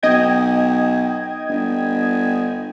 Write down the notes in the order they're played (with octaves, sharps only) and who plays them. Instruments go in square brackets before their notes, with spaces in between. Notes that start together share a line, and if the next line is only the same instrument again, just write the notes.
[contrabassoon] B1 [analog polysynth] D#5 G5 G#6
[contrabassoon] G1